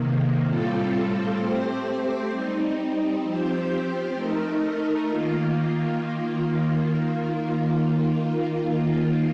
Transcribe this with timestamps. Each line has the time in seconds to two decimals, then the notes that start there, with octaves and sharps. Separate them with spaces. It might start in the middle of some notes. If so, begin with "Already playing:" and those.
Already playing: C3 D#3 A#3
0.45 A2 G3 C4 F4 A4
1.37 A3 C4 G4 C5
2.30 G3 C4 D#4
3.22 F3 C4 G4 C5
4.14 A3 D#4 A#4
5.06 D#3 A#3 F4